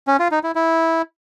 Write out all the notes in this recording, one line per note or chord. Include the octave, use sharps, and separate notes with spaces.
C#4
F4
D#4
E4
E4